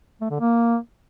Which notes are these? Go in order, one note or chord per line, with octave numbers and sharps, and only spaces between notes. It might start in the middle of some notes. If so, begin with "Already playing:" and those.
A3
D3
A#3